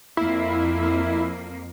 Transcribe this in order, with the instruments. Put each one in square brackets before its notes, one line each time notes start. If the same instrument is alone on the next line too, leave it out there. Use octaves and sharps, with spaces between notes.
[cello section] F2 A#3 [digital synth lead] E4